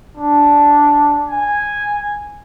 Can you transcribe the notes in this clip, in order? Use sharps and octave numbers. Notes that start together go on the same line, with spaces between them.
D4
G#5